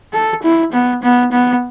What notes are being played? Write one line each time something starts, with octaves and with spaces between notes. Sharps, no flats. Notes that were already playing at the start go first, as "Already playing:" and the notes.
A4
E4
B3
B3
B3